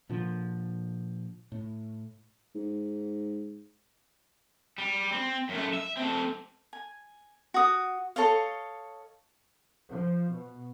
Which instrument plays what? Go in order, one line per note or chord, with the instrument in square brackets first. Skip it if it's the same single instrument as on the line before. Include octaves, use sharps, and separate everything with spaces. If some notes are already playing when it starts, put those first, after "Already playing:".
[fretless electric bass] A#2 D3 F3
A2
[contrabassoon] G#2
[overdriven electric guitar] G3
C4
F#2 A3
E5
A3 C4
[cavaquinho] G#5
F#4 D#6
A4 C#5 D#5 F5
[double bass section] F3
B2